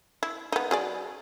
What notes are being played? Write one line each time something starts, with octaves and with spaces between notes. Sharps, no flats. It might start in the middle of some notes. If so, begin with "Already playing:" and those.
E4
B3 D#4
F#3 G#4 D5